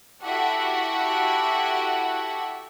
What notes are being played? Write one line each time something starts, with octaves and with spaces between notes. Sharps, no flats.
E4 F#4 G4 A4 E5 F#5